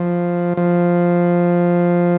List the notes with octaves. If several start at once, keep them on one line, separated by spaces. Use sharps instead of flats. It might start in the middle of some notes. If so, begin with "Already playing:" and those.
Already playing: F3
F3